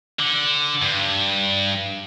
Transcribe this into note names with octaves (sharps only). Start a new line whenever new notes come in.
D3
G2